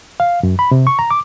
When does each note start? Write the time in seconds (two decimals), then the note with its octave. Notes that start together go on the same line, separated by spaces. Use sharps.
0.20 F5
0.43 F#2
0.59 B5
0.71 C3
0.87 C#6
0.99 A#5
1.11 D6